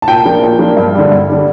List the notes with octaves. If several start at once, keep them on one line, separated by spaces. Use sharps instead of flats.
A5
A#2 G5
F3 A#3 D4
A#2
F3 A#3 D4
G2
D3 G3
G2
D3 G3